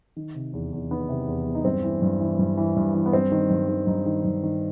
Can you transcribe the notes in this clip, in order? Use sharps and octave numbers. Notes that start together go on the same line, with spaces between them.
D#3
C3
E2
E2
D#3 B3
C3
E2
E2
D#4
G2 C4
E3
G2
E3
G2
E3
G2
E3
B3
G2 C4
D#3
G2
D#3
G2 D#4
D#3
G2
D#3